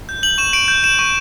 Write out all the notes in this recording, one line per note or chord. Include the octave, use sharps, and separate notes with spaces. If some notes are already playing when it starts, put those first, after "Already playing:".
G6
G6 F#7
C#6 E7
C#6 D7
G6
G6 E7
C#6